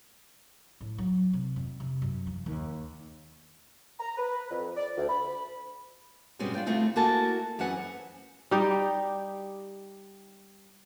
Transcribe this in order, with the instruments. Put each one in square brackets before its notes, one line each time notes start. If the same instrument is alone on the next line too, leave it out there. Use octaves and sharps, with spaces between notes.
[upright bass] A2
F#3
C3
F2
C3
F#2
F3
D#2
[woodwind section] A#5
B4
F2
D5
D2
B5
[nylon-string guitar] G2 B2 G3 G#3 C4 C#4
D4 F4 G5
D2 A3 C4 E4 F4
A#3 E4 F#4 A4 G#5 A5
F#2 E3 C4 G#4 F#5 G#5
[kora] G3 D#4 G4